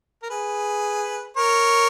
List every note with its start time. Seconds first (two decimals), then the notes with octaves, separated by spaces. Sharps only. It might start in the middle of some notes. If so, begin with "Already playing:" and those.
0.22 A#4
0.29 G#4 B4
1.37 A#4 C#5